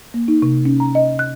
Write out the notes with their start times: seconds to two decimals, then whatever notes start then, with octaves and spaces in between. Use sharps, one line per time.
0.14 A#3
0.28 D#4
0.42 C3
0.65 C#4
0.80 A#5
0.95 D#5
1.19 F#6